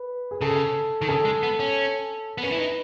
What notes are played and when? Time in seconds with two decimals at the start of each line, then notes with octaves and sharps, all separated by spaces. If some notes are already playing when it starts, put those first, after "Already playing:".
Already playing: B4
0.31 G#4
0.41 C#3 A4
1.02 D#3
1.08 C#3 A4
1.25 G#3
1.43 B3
1.60 C#4
2.38 B3
2.43 C#4 B4
2.52 E4
2.60 D#4